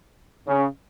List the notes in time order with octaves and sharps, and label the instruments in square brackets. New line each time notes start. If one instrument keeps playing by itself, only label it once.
[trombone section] C#3